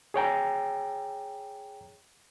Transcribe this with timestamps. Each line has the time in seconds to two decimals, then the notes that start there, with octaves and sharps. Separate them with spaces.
0.14 G#4 C#5 G5 A#5